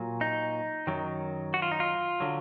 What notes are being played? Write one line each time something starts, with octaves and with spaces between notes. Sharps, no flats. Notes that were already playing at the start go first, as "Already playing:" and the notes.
Already playing: A#2 F#3
D#4
F#2 D#3 F#3
F#4
F4
D#4
F4
D3 F#3